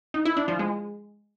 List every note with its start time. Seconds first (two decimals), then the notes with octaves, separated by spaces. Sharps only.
0.14 D#4
0.25 E4
0.37 D4
0.48 F3
0.59 G#3